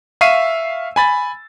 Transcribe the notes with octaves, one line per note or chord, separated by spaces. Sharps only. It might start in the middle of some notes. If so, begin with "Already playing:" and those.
E5 F5 C#6 E6 C7 D#7
G#5 B5 A6